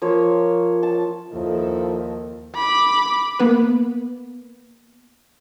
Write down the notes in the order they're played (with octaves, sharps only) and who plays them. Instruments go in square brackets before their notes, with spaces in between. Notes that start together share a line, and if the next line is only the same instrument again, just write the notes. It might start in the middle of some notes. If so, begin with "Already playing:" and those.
[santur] F3 A#3 C#5
A5
[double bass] D#2 [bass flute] F3 [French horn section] D#4 E4 A4
[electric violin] B5 D6
[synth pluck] A#3 B3 B4